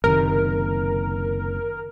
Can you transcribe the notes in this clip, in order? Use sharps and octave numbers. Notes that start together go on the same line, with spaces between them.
F#1 C3 D#3 A#4